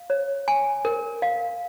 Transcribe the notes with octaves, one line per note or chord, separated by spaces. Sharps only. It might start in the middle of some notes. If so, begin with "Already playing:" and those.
Already playing: F5
C#5
G#5
A#4
F5